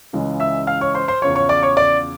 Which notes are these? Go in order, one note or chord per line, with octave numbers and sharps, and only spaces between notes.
C#2 C#3 E3 G#3 C#4
E5 E6
F5 F6
C#5 C#6
C5 C6
C5 C6
E2 C#3 F3 C#5 C#6
C#5 C#6
D5 D6
C#5 C#6
D5 D6